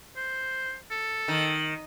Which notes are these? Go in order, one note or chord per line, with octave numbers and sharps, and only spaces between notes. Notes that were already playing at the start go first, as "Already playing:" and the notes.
C5
A4
D#3